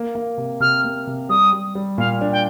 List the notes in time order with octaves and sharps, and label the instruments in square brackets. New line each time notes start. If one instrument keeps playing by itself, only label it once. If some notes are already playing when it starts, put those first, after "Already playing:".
Already playing: [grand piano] A#3
A#3
C3
[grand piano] C3 [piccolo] F6
[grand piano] A#3
C3
[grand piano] G3 [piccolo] D#6
[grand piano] G3
G3
[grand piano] A#2 [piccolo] F5
[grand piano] D4
[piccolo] G5